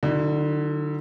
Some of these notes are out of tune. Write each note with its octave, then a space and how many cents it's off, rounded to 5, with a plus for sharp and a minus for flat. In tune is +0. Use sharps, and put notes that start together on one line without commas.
D3 +25 F#3 +0 E4 -40